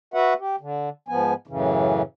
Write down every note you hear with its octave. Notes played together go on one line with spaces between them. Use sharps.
F#4 B4 E5 F#5
G4
D3
G#2 F3 B3 G#5
F#2 A2 C#3 E3